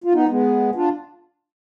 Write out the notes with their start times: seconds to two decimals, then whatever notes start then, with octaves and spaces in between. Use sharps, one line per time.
0.04 F4
0.13 B3 D#4
0.29 G#3 B3
0.75 D4 F4